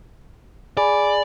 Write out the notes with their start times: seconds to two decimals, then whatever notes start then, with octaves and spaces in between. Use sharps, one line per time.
0.77 G#4 D5 G#5 B5